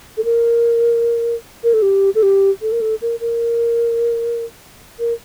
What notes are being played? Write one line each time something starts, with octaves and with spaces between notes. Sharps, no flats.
A4
A#4
A#4
A4
G4
A4
G4
A4
A#4
A4
A#4
A#4
A#4